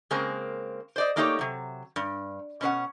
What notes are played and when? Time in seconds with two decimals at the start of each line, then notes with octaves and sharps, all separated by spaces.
0.11 C#3 G#3 A#3 C4 A#4
0.96 C5 D5 D#5
1.16 A3 A#3 D4 D#4 G4 C#5
1.39 C3 F#3
1.96 G2
2.61 B2 C#4 C5 F#5